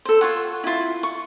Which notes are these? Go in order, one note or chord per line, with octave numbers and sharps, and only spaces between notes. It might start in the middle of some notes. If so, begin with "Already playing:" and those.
A4 C5
F4 C#5 F#5
E4 F4
C#6